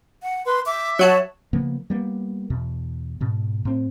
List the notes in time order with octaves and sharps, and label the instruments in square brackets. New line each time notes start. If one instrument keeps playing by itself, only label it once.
[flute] F#5
[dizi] B4 [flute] C6
[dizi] E5 [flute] D6
[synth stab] F#3 F#4 A5 [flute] C#5
[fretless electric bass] C#3 F3 A#3 B3
G3 A#3 B3
E2 B2
G#2 B2
A2 C4